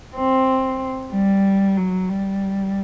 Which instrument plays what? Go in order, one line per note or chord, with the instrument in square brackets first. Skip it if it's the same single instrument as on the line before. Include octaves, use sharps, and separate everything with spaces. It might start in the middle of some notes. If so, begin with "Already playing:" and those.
[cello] C4
G3
F#3
G3